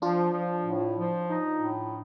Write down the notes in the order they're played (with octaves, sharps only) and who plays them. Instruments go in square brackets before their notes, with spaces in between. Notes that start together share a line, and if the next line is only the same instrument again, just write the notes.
[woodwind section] F3 [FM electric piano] D4 F4
[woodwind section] F3
A2
F3
D#4
A2